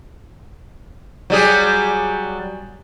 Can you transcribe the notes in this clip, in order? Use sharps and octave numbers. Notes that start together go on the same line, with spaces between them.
F#3 G3 G#4